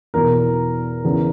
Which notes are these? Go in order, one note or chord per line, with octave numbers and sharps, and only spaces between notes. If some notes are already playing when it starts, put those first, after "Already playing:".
E2 B2 A#4
E2 C#3 E3